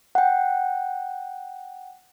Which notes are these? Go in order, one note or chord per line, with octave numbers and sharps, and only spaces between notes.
F#5 G5